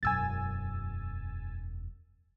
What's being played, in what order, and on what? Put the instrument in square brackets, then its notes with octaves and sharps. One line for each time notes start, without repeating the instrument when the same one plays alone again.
[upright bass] E1 F#2 [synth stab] G#5 E6 A6